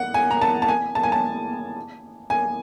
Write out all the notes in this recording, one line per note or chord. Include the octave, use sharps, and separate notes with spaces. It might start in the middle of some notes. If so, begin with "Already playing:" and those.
Already playing: F#5
G#5
A#5
A5
A5
G#5
A5
G#5
A5
G#5